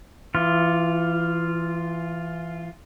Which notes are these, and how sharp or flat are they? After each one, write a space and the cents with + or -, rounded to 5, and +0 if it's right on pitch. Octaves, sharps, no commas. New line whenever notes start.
E3 +25 F4 +0